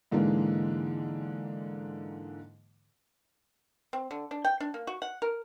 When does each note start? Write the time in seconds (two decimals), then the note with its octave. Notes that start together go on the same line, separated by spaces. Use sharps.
0.11 G#2 D3 E3 G#3 A#3
3.93 C4
4.11 D3
4.31 D4
4.45 G5
4.60 D4
4.74 A#3
4.87 F#4
5.02 F#5
5.22 A#4